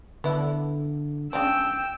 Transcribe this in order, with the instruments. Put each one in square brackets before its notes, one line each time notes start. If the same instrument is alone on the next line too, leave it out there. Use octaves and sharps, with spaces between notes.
[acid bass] D3 [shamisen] B3 E4
[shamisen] C#3 G#3 D4 [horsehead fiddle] G5 [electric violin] E6